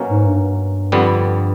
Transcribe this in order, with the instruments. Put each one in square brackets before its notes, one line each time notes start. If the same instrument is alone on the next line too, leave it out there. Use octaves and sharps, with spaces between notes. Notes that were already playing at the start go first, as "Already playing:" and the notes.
Already playing: [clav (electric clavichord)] B2 F#3 A#3 C#4
[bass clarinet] G#2
G2
[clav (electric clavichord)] F2 D3 G3 B3